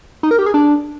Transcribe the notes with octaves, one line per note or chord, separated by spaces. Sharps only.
D#4
A#4
G4
G#4
D4